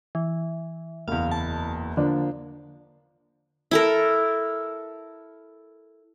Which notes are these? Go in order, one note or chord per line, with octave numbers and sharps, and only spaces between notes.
E3
F#1 E2 F5
A5
D3 F3 A#3 D4
E4 A4 A#4